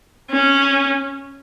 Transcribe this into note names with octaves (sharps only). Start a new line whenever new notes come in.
C#4